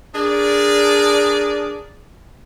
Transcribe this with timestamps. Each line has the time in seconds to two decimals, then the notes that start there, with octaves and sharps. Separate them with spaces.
0.14 D4 G#4 A#4 D5